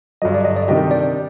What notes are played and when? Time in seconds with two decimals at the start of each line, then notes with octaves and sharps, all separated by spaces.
0.22 G2 D3 F#3 D#5
0.34 D5
0.45 D#5
0.56 D5
0.68 C3 D#3 G3 D4 G4 D#5
0.91 D5